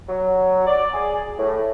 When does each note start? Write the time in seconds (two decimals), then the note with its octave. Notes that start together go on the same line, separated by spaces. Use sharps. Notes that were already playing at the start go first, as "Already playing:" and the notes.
0.08 F#3
0.67 D5
0.93 G#4
1.38 A2